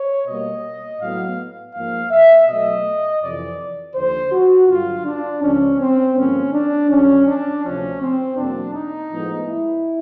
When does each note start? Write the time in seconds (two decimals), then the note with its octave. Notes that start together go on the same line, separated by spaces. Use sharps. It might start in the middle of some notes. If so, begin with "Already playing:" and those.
Already playing: C#5
0.26 B2 G3 A#3 D#5
1.00 A2 F#3 B3 F5
1.74 G#2 F3 A#3 F5
2.11 E5
2.47 B2 F#3 A3 D#5
3.22 F2 C3 E3 D5
3.95 D#2 D3 F3 C5
4.32 F#4
4.69 G2 D3 F#3 F4
5.06 D4
5.42 C#2 C#3 F3 C#4
5.80 C4
6.16 G2 D3 F3 A#3 C#4
6.53 D4
6.89 F2 D3 F#3 C#4
7.27 D4
7.64 D2 C3 F3 C#4
8.01 C4
8.37 E2 B2 F#3 A#3 D4
8.74 D#4
9.11 A2 F3 G#3 B3
9.48 E4